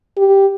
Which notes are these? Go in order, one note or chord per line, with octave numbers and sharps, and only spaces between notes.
G4